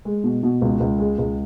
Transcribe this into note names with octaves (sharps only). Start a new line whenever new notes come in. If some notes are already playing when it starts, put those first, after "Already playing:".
G#3
B2
B2
C#2
C#2
G#3
C#2